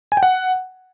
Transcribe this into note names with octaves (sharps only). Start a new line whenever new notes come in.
G#5
G5
F#5